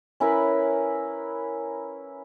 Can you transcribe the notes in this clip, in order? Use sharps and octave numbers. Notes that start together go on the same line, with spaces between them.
C#4 E4 A#4 B4